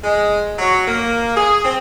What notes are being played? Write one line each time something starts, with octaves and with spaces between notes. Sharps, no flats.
G#3
F#3
A#3
G#4
C4